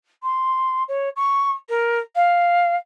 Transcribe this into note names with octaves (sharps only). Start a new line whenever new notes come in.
C6
C#5
C#6
A#4
F5